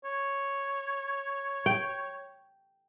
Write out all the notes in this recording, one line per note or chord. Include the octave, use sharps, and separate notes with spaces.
C#5
G5